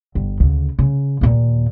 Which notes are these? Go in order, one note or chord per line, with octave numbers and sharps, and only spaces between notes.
G1
D2 C#3
C#3
D#2 A#2